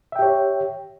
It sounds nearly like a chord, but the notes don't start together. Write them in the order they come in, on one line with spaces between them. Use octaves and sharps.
E5 G5 G4 C#5